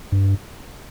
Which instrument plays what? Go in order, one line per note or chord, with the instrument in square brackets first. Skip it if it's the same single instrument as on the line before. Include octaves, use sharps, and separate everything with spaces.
[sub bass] G2